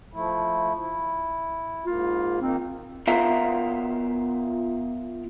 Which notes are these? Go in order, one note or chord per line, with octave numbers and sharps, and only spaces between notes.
F3 A3 E4
E4
G#2 A#3 F4
D#3 A#3 C4 D#4
B3 F4 A#4 E5 F5 A#5